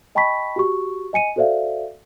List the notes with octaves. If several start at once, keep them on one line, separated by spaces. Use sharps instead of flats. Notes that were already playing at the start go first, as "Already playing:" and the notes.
D#5 G5 A5 B5 C#6 B6
F#4 G4 C#6
D#5 G#5 C#7 D#7
F#4 A4 C5 D5 E5 F5